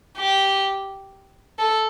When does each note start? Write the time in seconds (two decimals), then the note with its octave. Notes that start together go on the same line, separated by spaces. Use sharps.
0.17 G4
1.59 A4